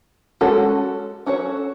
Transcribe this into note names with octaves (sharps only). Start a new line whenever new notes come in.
G#3 C#4 F#4 A4
C#4 F#4 A4 C#5